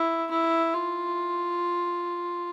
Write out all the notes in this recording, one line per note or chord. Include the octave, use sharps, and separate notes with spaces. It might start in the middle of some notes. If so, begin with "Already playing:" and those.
Already playing: E4
E4
F4